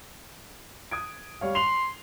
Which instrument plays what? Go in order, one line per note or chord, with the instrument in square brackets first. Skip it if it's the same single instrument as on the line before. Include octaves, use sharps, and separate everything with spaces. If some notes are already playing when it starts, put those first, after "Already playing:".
[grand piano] D#6 G#6 D7
G3 C#5 F5
[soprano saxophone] C6 [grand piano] F7 F#7